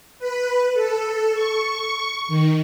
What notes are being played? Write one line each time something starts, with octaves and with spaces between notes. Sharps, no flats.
B4
A4
C#6
C#6
D#3